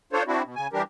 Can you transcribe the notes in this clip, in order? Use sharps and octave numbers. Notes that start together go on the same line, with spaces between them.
D4 F4 A4 C5 C#5
C4 D4 E4 F#4
B2
C#3 G#5
E3 G3 D4 G4 A#4